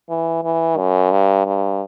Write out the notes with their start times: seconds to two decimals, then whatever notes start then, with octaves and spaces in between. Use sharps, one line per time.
0.09 E3
0.43 E3
0.77 F#2
1.11 G2
1.46 G2